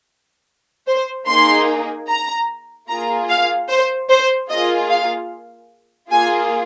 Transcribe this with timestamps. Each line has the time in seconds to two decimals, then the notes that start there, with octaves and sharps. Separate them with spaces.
0.87 C5
1.27 A#3 D#4 G#4 C6
2.08 A#5
2.88 A#3 F4 G#4 A#5
3.29 F5
3.69 C5
4.10 C5
4.50 A#3 F4 G#4 D#5
4.90 F5
6.11 A#3 F4 G#4 G#5